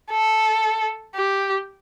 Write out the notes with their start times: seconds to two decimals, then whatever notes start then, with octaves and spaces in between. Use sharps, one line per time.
0.10 A4
1.15 G4